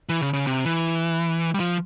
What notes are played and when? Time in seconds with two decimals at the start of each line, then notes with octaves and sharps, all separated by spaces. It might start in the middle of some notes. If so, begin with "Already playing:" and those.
0.09 E3
0.21 C#3
0.33 C#3
0.47 C3
0.65 E3
1.54 G3
1.60 F3